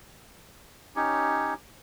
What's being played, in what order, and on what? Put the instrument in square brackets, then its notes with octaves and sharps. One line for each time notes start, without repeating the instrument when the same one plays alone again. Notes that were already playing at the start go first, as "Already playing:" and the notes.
[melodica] C#4 D#4 G4 C#5